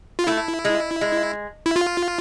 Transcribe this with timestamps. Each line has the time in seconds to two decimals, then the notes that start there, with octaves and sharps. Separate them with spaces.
0.19 F4
0.27 A3 E4
0.65 G#3
1.01 G#3
1.66 E4
1.76 F4